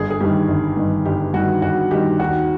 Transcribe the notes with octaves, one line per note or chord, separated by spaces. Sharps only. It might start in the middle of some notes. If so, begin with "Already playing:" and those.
Already playing: G1 G#4
G#4
G2 D#3 G4
G1
G2 D#3
G1 G4
G2 D#3 F#4
G1 F#4
G2 D#3 G4
D#2 F#4